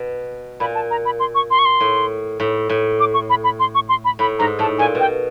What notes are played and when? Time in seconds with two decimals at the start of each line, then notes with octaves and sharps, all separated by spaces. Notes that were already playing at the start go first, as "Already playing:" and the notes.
Already playing: B2
0.60 A#2 B5
0.75 A5
0.91 A#5
1.05 B5
1.20 C6
1.35 C#6
1.51 C6
1.59 C#6
1.65 C6
1.80 A2
2.40 A2
2.69 A2
3.00 D6
3.14 C#6
3.30 B5
3.44 B5
3.60 C6
3.75 C#6
3.89 C6
4.05 B5
4.19 A2 B5
4.39 G#2 A#5
4.59 A2 A5
4.79 A#2 G#5
4.95 B2 G5